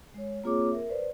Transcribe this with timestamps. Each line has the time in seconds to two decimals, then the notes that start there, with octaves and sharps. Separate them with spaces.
0.14 G#3 C#5
0.44 A#3 C4 F4 G#4 C#5 D6
0.71 A#4 E5
0.89 B4 C5 D5